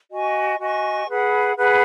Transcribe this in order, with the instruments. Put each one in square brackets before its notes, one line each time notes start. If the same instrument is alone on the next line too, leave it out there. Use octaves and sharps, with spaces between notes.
[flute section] F#4 D#5 G#5 C#6
F#4 D#5 G#5 C#6
G#4 B4 F#5 B5
G#4 B4 F#5 B5